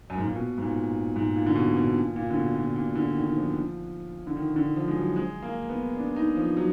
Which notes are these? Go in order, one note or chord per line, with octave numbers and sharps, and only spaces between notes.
F#2
G#2
A#2
B2
G#2
A#2
G#2
A#2
D3
B2
B2
A#2
A#2
D3
B2
A#2
A#2
D3
D#3
D#3
F3
D3
D#3
D3
F3
G#3
F#3
G#3
A#3
B3
D4
D#4
F3
F#3